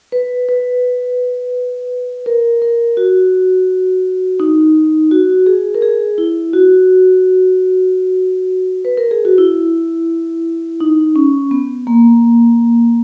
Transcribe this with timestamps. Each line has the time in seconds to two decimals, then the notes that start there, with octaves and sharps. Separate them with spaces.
0.12 B4
0.49 B4
2.26 A#4
2.62 A#4
2.97 F#4
4.40 D#4
5.11 F#4
5.46 G#4
5.75 A#4
5.82 G#4
6.18 E4
6.53 F#4
8.85 B4
8.97 A#4
9.11 G#4
9.25 F#4
9.38 E4
10.80 D#4
11.16 C#4
11.51 B3
11.87 A#3